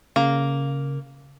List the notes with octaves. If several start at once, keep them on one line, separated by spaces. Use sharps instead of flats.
C#3 A#3